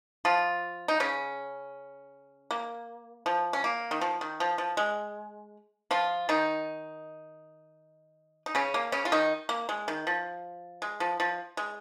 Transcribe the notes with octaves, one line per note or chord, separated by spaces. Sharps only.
F3 F4
D#4
C#3 C#4
A#3
F3
C#4
A#3
D#3
F3
D#3
F3
F3
G#3
F3 F4
D#3 D#4
D#4
C#3 C#4
A#3
C#3 C#4
F4
D#3 D#4
A#3
G#3
D#3
F3
G#3
F3
F3
G#3